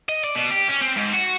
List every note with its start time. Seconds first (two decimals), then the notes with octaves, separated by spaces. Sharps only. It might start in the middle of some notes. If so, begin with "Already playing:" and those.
0.09 D#5
0.24 D5
0.35 B2
0.51 G4
0.69 C#4
0.82 C4
0.97 G#2
1.14 F#4